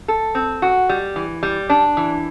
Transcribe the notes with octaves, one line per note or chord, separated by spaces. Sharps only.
A4
C4
F#4
G3
E3
G3
D4
E3